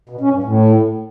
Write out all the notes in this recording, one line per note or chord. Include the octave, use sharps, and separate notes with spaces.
B2
C#4
G2
A2